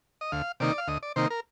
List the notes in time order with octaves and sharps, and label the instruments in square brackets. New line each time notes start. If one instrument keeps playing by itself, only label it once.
[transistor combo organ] D#5
D2 F5
C3 D#3 A#3 D#4 D5
F5
D2 D#5
D5
C3 D#3 A#3 D#4 C5
A#4